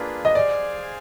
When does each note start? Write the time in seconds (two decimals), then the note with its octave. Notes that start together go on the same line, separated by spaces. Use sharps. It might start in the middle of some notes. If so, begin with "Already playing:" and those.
Already playing: A#3 D4 F4 G#4 B4
0.25 D#5
0.35 G#4 C5 D5 F5 G#5